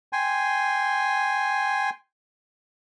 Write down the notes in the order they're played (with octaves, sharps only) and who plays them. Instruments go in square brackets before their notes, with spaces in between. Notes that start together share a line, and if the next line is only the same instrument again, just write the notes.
[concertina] G5 G#5 C6